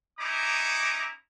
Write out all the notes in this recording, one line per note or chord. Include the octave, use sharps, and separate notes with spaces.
C#4 D#4 E4 A#5 D6 D#6